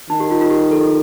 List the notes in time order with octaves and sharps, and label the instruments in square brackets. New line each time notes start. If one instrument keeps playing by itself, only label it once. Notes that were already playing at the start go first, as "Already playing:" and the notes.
[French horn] D#3 [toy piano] D#4
[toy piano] G4
F4
F4
G4
A4